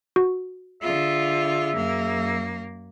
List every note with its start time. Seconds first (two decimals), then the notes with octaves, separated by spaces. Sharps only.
0.16 F#4
0.82 D3 F4 G#4 E5
1.75 F#2 A#3